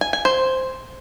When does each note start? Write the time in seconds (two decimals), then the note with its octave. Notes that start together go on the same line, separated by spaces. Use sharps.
0.01 G#5
0.13 G#5
0.25 C5